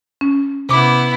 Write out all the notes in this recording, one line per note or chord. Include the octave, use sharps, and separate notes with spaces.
C#4
C3 B3 E4 D6